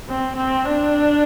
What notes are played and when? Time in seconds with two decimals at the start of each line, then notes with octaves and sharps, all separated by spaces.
0.08 C4
0.36 C4
0.65 D4